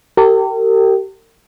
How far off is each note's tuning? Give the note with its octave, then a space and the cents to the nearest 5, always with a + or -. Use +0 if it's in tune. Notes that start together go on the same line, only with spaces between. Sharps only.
G4 -25 A#4 -45